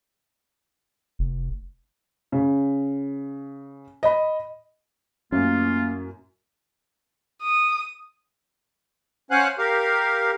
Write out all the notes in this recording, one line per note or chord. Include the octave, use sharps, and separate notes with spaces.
F1
C#3
D#5 B5
F#2 A2 A#3 C#4 F4
D#6
C#4 C5 F5 F#5 G#5 F#6
G4 A#4 F5